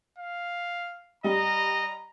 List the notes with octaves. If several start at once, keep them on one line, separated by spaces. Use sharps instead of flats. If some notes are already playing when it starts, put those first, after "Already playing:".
F5
G3 D#5 A#5